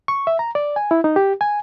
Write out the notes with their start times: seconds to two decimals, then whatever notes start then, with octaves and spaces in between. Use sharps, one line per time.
0.08 C#6
0.27 E5
0.39 A#5
0.55 D5
0.76 G#5
0.91 E4
1.04 D#4
1.16 G4
1.41 G#5